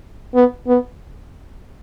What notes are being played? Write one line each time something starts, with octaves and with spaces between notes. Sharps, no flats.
B3
B3